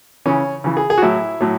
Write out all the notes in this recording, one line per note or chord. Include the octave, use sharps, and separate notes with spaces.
C#3 E3 C#4
C#3 E3
G#4
G#4
F#4
A2 F#3 E4
A2 F#3